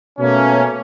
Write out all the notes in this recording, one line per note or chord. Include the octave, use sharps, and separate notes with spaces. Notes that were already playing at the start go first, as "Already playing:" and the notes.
B2 A3 A#3 C#4